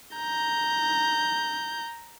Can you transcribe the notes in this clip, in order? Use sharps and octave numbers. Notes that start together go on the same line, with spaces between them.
A#5 G6